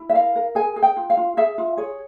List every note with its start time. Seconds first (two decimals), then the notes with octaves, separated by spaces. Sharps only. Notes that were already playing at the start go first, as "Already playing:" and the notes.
Already playing: E4
0.09 E5
0.14 A#4 F5
0.36 A#4
0.55 G#4 G#5
0.76 G#4
0.83 G5
0.97 F4
1.10 F5
1.17 F4
1.37 G#4 E5
1.58 F4
1.77 G#4 C#5